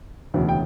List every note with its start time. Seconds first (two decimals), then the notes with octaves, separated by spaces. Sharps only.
0.34 E1 D2 C#3 E3
0.49 G5